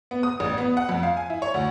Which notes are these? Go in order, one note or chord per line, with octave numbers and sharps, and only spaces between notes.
B3
D#6
A1
B3
F#5
F2
F5
G#5
E4
C#5
D2